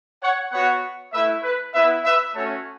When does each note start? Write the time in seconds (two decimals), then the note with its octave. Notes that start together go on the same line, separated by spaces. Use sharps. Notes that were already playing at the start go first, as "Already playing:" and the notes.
0.21 C#5 F#5
0.51 B3 F#4 C#5 F#5
1.12 A3 E4 B4 E5
1.43 B4
1.73 B3 E4 B4 E5
2.04 B4 E5
2.34 A3 C#4 F#4 A4 C#5